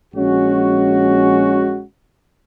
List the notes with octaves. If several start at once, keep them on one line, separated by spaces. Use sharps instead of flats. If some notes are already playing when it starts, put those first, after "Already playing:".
A#1 G#3 C#4 F#4